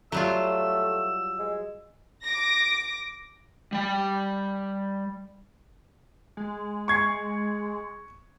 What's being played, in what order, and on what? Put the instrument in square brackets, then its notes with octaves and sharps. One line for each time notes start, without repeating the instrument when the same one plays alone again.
[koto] F#3 G3 F4 [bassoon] A3 [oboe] E6
[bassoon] G#3
[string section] D6 A#6
[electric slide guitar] G3 G5
[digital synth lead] G#3
[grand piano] C#6 G#6 C7